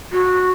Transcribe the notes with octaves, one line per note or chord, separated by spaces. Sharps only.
F#4